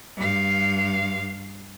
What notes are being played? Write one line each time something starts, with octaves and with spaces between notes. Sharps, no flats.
G2 F5